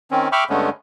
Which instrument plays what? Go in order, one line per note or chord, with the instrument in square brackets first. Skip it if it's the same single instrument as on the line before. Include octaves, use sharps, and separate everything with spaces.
[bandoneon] D#3 C4 C#4
E5 G5 B5 C#6 D6 F6
G2 D3 G#3 A3 B3 C#4